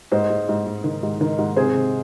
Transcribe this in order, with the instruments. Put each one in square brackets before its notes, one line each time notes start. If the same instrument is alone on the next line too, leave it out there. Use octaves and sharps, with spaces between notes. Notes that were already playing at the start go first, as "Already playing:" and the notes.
[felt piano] G#2 C5 D#5
G#2
G#2
G#2
D#3
G#2
D#3
G#2
C3 G#4 C5
C3